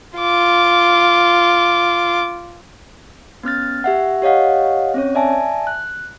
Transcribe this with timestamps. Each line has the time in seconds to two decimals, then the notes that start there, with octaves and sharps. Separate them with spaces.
0.18 F4 D6
3.43 B3 C#4 F6 A6
3.84 G4 E5 F#5
4.22 G4 C#5 D#5 F5 F#5
4.94 C4 C#4 C#5
5.15 D5 E5 G#5 A5
5.67 F#6